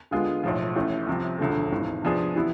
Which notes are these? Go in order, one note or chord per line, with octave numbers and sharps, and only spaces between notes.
D3 G#3 B3 F4 G#4
B1 A2 F3
A1 A2 E3
C2 C3 F3
E1 D2 D3 F3 A3
G#1 G#2 E3
C3 F3 B3 D4 G#4
E3 B3 E4